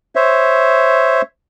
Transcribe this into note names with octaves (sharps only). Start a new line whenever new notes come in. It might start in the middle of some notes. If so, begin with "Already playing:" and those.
C5 C#5 E5